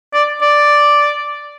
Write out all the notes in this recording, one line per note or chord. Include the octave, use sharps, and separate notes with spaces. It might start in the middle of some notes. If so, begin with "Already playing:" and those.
D5
D5